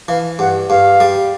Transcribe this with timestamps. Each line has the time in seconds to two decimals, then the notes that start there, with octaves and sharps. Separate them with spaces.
0.08 E3 F5
0.39 G2 F#5
0.69 G2 F5
1.00 G3